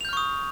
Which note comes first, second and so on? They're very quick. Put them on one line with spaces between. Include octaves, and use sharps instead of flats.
F7 G6 F6 C#6 D#6